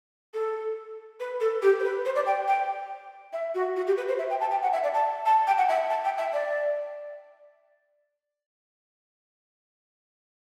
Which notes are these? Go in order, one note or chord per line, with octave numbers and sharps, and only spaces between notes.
A4
B4
A4
G4
C5
B4
C5
D5
G5
G5
E5
F#4
F#4
G4
B4
C5
E5
G5
A5
G5
F#5
E5
D5
A5
A5
G5
F#5
E5
A5
G5
E5
D5